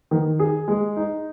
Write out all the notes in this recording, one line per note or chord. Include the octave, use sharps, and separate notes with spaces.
D#3
G#4
G#3
D#4